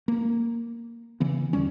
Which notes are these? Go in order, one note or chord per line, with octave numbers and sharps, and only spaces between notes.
A#3
C#3 E3 B3
E2 D3 G3 C#4